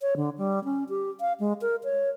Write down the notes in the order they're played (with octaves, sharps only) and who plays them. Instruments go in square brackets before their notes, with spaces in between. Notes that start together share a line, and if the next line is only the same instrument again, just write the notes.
[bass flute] C#5
D3
G3
C#4
G4
F5
G#3
A#4
C#5